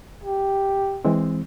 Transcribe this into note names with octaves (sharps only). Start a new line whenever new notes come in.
G4
E3 G#3 C4